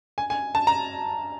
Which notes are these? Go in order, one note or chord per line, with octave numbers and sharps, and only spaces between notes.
G#5
G#5
A5
A#5